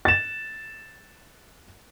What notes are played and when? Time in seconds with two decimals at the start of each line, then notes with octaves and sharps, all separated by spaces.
0.05 A6 E7